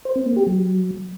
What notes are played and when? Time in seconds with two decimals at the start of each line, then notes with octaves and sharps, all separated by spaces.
0.05 C5
0.16 C4
0.26 A#3
0.36 G4
0.47 F#3